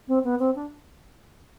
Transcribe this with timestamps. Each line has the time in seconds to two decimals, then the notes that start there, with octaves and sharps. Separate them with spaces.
0.08 C4
0.24 B3
0.40 C4
0.55 D4